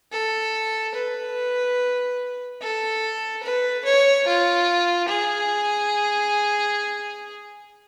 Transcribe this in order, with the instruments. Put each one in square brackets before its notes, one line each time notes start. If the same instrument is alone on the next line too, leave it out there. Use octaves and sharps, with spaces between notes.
[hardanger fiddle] A4
B4
A4
B4
C#5
F4
G#4